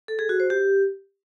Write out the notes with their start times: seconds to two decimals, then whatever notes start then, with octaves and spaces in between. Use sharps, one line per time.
0.08 A4
0.19 G#4
0.29 F#4
0.40 C5
0.50 G4